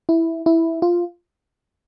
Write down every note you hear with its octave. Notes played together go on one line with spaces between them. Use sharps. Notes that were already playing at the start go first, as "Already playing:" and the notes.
E4
E4
F4